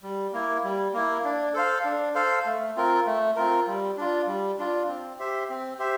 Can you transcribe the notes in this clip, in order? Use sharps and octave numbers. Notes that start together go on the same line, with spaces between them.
G3
A#3 E4
G3
A#3 E4
D4
A4 C5 F5
D4
A4 C5 F5
A3
C4 F4 A#4
A3
C4 F4 A#4
G3
D4 F4
G3
D4 F4
C4
G4 C5 E5
C4
G4 C5 E5